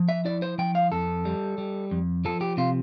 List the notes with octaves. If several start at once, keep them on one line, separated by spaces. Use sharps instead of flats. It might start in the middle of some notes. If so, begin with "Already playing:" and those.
Already playing: F3
E5
E4 D5
C5
F3 G5
F5
F2 A4
G3
G3
F2
F3 A4
G4
C3 F4